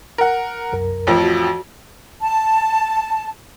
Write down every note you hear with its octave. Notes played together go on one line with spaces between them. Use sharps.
A#4 F#5
C2 F#2 A#4
A1 F2 F3
F#4
A5